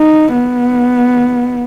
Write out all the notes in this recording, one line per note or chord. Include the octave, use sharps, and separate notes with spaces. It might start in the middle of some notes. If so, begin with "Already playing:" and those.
Already playing: D#4
B3